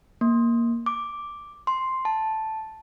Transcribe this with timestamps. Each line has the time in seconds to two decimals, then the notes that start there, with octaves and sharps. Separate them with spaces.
0.21 A#3
0.86 D6
1.67 C6
2.05 A5